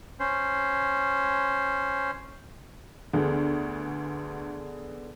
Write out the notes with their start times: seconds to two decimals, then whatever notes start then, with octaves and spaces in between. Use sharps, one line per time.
0.20 C#4 C5
3.14 D2 D3 B3 G#4